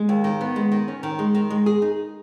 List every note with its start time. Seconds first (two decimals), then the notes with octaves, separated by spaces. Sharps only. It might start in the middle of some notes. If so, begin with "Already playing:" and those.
Already playing: G#3
0.09 D#2
0.24 D#3
0.41 B3
0.56 G#3
0.72 D#3
0.88 C#4
1.03 D#3
1.19 G#3
1.35 D#3
1.50 G#3
1.66 G#4
1.82 D#4